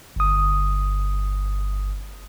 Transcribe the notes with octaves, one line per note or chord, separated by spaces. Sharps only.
G1 D#6